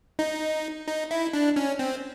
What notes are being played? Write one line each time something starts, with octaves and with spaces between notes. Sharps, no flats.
D#4
D#4
E4
D4
C#4
C4